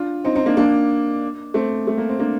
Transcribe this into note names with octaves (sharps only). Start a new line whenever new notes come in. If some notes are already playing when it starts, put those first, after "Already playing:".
Already playing: D4 F4
C4 D#4
C4 D#4
A#3 D4
A#3 D4
A3 C4
A3
A#3
C4
A#3 D4